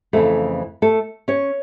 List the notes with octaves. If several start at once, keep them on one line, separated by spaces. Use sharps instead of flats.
F2 C#3 E3 A3 A4
A3 A4
C#4 C#5